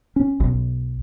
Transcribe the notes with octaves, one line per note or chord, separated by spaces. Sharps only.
C#4
B1